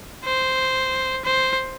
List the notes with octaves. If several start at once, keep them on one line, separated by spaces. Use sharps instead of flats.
C5
C5